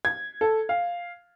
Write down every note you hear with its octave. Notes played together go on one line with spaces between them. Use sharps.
G#6
A4
F5